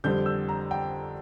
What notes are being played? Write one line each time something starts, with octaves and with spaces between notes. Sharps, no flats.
F2 D3 G3 C4 G6
E6
A#5
G5